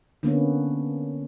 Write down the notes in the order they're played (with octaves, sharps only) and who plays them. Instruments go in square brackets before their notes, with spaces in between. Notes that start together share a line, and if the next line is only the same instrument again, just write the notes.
[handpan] D3 A#3 B3 C#4